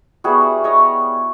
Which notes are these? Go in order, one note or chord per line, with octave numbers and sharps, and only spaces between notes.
G3 B3 E4 F#4 G#4
C#5 D#5